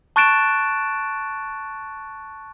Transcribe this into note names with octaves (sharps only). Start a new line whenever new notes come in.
A5 C#6 F#6 A6 D7 E7